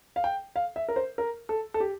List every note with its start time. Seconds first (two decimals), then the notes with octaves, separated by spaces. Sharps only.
0.16 F5
0.24 G5
0.56 F5
0.76 E5
0.88 A#4
0.96 C5
1.18 A#4
1.49 A4
1.74 A4
1.80 G4